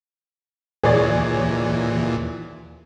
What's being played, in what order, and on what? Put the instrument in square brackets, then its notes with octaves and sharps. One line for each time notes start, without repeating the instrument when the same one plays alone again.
[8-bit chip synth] D#2 A#2 E3 [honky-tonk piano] G#4 C#5 D5